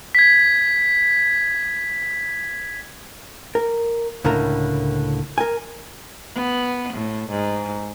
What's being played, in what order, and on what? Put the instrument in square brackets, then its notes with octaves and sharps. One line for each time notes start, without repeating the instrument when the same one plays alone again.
[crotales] G#6 B6
[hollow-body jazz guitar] A#4
C#2 A2 D3 A3 A#4 A#5
A#4 G#5
[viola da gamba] B3
A2
G#2